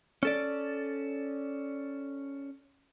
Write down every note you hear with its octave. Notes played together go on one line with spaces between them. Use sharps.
C#4 A4 D5